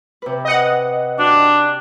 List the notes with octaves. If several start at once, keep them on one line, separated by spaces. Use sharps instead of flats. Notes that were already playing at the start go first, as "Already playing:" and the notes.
C3 B4
D#5 F#5
D4 F#4 G4